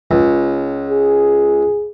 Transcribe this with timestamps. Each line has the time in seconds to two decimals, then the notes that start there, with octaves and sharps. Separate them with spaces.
0.11 C#2
0.90 G#4